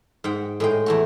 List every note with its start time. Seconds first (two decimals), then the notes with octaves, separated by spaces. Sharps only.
0.24 G#2 F#5 G5
0.60 A2 G#3 G5
0.86 E2 A3 F#4